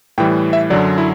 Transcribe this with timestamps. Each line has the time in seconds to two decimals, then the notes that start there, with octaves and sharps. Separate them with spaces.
0.18 A2 E3 G3 G5
0.53 E5
0.70 F#2 D3 F#3 D5
0.98 E4